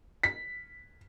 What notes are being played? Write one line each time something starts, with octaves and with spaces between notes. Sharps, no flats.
B6